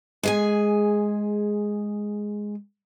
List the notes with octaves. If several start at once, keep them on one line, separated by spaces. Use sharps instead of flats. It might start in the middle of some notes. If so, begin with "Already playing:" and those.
G#3 G#4 G#5